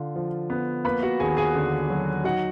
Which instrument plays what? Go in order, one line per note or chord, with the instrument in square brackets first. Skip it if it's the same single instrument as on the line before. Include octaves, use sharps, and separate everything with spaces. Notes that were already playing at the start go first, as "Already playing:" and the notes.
Already playing: [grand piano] D3 F4
F3
B3
A#3 B4 B5
F#4 F#5
D#2 G#4 G#5
G#4 G#5
D3
F#3
D#4 F#4 F#5